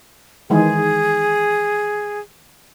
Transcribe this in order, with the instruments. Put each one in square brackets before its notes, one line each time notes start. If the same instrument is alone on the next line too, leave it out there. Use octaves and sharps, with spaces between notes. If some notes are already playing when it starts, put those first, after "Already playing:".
[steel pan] D#3 E3 G#3 [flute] G#4